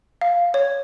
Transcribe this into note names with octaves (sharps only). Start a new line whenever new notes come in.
F5
C#5